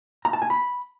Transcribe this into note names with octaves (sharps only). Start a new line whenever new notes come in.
A#5
A5
G#5
B5